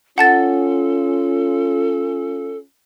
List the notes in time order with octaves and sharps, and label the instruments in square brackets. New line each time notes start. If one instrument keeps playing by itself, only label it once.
[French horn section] C#4 F4 [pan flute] A4 [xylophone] F#5 A5 A6